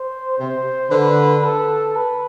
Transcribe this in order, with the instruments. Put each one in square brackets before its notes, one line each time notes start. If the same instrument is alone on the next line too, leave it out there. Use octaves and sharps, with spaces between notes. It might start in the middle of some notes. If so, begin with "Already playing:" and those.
Already playing: [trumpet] C5
[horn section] C3 [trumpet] C5
[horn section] D3 [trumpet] B4
[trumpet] A4
B4